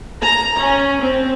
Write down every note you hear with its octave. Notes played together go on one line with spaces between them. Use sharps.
A#5
C#4
C4